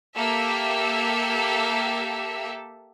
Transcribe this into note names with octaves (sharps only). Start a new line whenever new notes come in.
A#3 G4 A4 E5